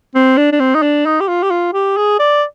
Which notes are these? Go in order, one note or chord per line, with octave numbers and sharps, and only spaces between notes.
C4
D4
D4
C4
D#4
D4
D#4
G4
F4
G4
F4
G4
G#4
D5